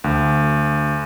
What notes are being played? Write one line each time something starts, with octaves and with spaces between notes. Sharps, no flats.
D2